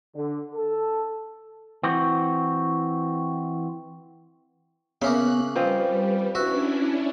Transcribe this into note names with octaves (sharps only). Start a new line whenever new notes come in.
D3
A4
E3 C4 F#4
C#3 A#3 B3 C#4 E5 F#6
F3 G3 C4 B4 D#5
C#4 D4 E4 F#4 E5